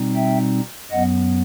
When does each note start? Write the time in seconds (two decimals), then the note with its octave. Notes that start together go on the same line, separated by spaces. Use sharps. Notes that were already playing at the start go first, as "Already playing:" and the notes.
Already playing: B2 G3 C4 D#4
0.15 E5 G5
0.91 F#2 F#3 B3 D#5 F#5